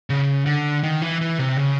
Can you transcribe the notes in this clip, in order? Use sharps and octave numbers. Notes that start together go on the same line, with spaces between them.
C#3
D3
D#3
E3
E3
C3
C#3